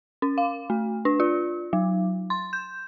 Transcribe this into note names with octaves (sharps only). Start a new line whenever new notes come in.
C#4
F5
A3
D4
F4
F#3
C6
G6